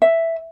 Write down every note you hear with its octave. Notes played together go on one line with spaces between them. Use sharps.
E5